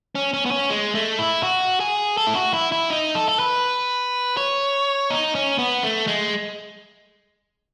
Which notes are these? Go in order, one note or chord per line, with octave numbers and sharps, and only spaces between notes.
C#4
C#4
B3
C#4
G#3
A3
E4
F#4
G#4
A4
E4
F#4
E4
E4
D#4
A4
A4
B4
C#5
D#4
C#4
B3
A3
G#3